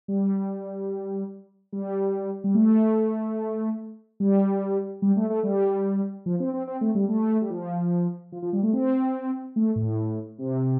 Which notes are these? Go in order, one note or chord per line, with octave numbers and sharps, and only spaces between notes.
G3
G3
G3
A3
G3
G3
A3
A3
G3
F3
C4
C4
C4
A3
G3
A3
G3
F3
F3
F3
G3
A3
C4
A3
A2
C3